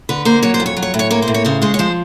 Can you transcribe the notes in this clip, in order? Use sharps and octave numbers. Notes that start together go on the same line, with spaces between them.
D3 B4
A#3 C5
F#3 C#5
C5
F2
C#5
F#3
C#5
A2
C#5
A#3 C#5
C5
A2
C#5
C#3 C5
G#3 C5
C#5
F3 C5